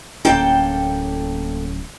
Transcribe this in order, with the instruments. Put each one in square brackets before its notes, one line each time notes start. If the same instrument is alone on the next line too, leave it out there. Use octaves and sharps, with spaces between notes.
[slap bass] D1 C#4 [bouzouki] A#3 A4 G5